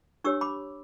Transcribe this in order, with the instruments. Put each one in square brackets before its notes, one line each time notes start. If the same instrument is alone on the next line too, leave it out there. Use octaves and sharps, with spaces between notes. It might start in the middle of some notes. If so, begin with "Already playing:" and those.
[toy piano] D4 G4 C#5 C#6 E6
B5 D6